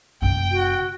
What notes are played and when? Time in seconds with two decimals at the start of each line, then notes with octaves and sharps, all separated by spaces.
0.22 F#1 C3 G5
0.51 F#4